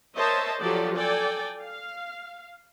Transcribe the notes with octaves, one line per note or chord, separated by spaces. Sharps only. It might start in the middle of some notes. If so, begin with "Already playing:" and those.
A#4 C5 C#5 D#5 E5 A5
F3 F#3 G4 A4 D5
A4 D5 G5 G#5
F5